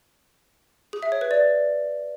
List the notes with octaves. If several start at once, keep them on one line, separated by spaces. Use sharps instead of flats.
G#4
E5
C#5
B4
D5